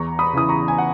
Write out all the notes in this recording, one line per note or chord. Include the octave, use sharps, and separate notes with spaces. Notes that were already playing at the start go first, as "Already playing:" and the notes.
Already playing: E2 A#5 C#6
B5 D#6
C#3 E3 D#6
A#5 C#6
G#5
F#5